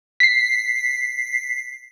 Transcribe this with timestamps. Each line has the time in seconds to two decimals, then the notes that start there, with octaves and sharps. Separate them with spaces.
0.20 B6 C7